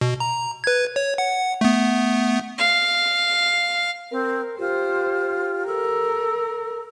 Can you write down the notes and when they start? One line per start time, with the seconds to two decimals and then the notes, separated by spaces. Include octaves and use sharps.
0.01 B2
0.20 A#5
0.64 B4 G#6
0.96 C#5
1.18 F#5
1.61 A3 B3
2.58 F5
4.12 C4 A#4
4.59 F4 G4 C5
5.67 A4 A#4